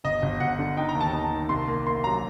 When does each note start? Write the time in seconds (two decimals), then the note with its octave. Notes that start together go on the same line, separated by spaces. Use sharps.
0.04 G1 D#5
0.22 G1
0.40 G1 F#5
0.59 D3
0.77 D#4 G5
0.89 A#5
0.95 D#2
1.01 A5
1.13 D#4
1.32 D#3
1.49 C2 C6
1.68 A#3
1.87 A#3 C6
2.04 F#3 A#5